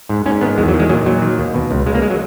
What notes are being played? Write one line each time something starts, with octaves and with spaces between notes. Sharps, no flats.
G#2
G#2 C#4
D#3 B3
E2 G#3
F#3
D#3
G#3
A#2 F#3
A#2 F#3
D#3
D#2
B2
C#2
C#2 G#3
A#3
G#3
F#3